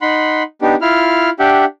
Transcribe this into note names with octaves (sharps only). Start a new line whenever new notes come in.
D#4 F#5 B5 C6
B3 D4 D#4 G4
E4 F4 F6
D4 G4 E5 F#5 G5